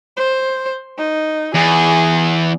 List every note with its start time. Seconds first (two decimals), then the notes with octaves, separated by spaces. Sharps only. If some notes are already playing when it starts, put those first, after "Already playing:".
0.17 C5
0.98 D#4
1.54 E2 G#4